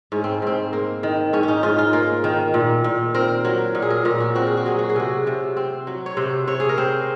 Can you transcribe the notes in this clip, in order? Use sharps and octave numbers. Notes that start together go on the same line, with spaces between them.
G#2 C#4
C4
G#2 C4
A#3
D#3
G#2 C#4
C#4 D#4
G#2 F4
F4
A#3
D#3
A#2
A#2
C4 A#4
F#3
A#2
G#4
A#4
A#2 A#4
F#4
C4 F#4
G#4
F#4
F#3 G#4
F#4
G#4
C3 F#4
C3
C4
F#3
C#5
C3 C5
C3 C#5
G#4
A#4
C4 C5